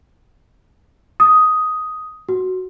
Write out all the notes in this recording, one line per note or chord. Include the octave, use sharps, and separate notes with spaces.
D#6
F#4